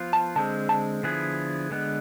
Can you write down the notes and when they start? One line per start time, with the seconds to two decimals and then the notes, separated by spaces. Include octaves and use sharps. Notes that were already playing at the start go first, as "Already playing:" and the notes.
Already playing: F3 B3 F4
0.13 A5
0.36 D3 G#3 C4 A5
0.69 A5
1.03 D3 F3 B3 E4 G#4
1.71 D3 G#3 B3